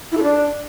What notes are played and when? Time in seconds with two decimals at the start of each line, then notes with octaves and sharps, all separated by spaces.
0.11 E4
0.17 A4
0.23 D4